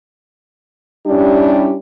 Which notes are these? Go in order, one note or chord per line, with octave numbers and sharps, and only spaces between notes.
G3 C#4 D4 E4 G4